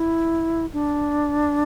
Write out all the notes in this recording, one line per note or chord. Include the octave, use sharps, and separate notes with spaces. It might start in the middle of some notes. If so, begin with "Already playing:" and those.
Already playing: E4
D4